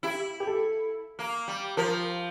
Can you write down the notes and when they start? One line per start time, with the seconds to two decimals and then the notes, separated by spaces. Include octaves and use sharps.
0.03 E4 G4
0.40 G4
0.47 A4
1.19 A#3
1.48 G3
1.77 F3 A#4